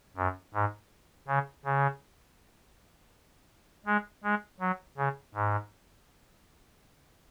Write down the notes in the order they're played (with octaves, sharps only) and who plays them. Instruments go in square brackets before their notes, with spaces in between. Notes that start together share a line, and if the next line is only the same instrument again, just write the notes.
[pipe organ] F#2
G#2
C#3
C#3
G#3
G#3
F#3
C#3
G#2